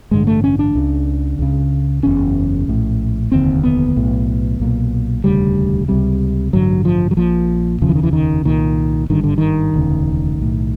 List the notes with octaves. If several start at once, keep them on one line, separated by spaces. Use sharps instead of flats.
A1 G2 D3 G#3
A3
C#4
D4
C#2 C#3
C#2 C#3
F#1 E2 C#3 C#4
A#1 A2
F1 D#2 D3 C4
B3
B1 A2
B1 A#2
E1 D2 C#3 G3
C#2 C3 G3
A1 G2 D3 F#3
F3
F#3
A#1 A#2 F3
F1 D#2 C#3 F3
E3
D#3
E3
D#3
C2 A#2 D#3
G#1 G2 D3 D#3
D3
D#3
E1 D2 C#3
B1 A2